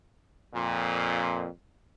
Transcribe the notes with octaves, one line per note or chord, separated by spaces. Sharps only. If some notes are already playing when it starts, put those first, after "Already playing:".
F2 A#2